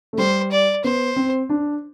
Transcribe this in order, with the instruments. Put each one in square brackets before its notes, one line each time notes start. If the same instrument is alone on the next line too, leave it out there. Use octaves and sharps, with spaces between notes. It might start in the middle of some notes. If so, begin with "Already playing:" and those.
[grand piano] A3
[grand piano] G3 [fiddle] C5
[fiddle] D5
[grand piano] B3 [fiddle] C5
[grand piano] C4
D4